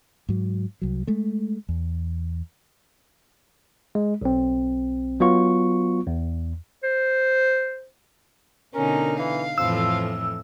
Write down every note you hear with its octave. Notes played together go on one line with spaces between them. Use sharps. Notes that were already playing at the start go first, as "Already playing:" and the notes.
G#2 F#3
C2 F#3
G#3 A3
E2
G#3
B1 C4
F#3 B3 F4 C#6
E2
C5
B2 D3 C#4 D#4 A#4
E3 F5
F2 A2 E3 F3 E6